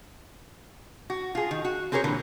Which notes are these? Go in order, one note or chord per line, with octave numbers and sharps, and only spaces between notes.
F#4
F4 G#4
D#3
F#4
C4 G4 G#4 A#4 C#5
A#2 D3 E3